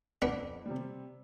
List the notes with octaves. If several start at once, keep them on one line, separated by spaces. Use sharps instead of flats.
F2 B3 D4
C3 G3